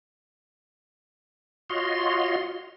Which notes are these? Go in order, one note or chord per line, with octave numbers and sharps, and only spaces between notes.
F4 F#4 C#5 D#5 C6